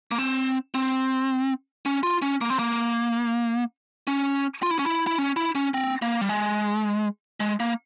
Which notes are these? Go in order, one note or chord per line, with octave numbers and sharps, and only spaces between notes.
A#3
C4
C4
C#4
F4
C#4
A#3
C4
A#3
C#4
F4
E4
C#4
E4
E4
C#4
E4
C#4
C4
A#3
G3
G#3
G#3
A#3